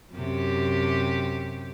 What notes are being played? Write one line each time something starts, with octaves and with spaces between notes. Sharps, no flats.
F#2 C3 G4